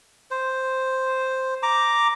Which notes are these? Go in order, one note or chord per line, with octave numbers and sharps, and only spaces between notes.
C5
A#5 D6